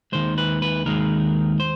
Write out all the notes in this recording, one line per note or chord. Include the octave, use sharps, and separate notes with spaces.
D#2 D#3 G#3 C5
B4
B4
D#2 D#3 G#3 A#4
C5